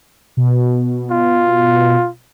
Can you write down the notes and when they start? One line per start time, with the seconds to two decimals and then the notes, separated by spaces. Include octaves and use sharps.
0.37 B2
1.11 F4